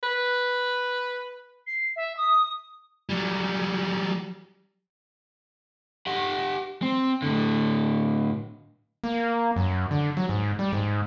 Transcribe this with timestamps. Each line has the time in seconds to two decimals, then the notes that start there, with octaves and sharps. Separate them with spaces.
0.03 B4
1.67 C7
1.96 E5
2.17 D#6
3.09 F#3 G3
6.07 G4 F#5
6.82 C4
7.22 A2 D3
9.04 A#3
9.56 F#2
9.91 D3
10.17 F#3
10.29 G#2
10.59 G3
10.73 G#2